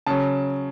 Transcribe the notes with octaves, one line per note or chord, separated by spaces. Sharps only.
C#3 F#3 A5